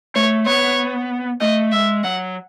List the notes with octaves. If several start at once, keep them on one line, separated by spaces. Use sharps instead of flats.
A3 C#5
B3 C#5
A3 D#5
G#3 E5
F#3 F#5